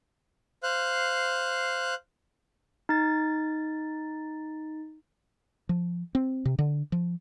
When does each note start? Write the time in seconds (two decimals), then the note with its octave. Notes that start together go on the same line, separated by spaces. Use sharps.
0.63 C5 F5 F#6
2.89 D#4 A6
5.69 F3
6.15 C4
6.45 C3
6.59 D3
6.92 F3